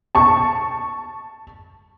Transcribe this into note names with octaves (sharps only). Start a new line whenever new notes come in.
A5 C#6